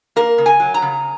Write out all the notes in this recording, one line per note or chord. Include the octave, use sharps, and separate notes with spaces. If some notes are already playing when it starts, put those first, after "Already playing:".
A#3 A#4
C#3
G#5
F#3
A#5
C#3